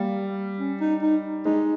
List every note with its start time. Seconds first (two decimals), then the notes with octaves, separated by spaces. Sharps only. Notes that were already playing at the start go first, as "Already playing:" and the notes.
Already playing: G3 A#3
0.58 C#4
0.80 D#4
1.02 D#4
1.45 G#3 D#4